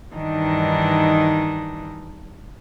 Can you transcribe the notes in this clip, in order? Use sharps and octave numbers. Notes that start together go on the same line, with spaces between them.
G2 D#3 E3 D4 D#4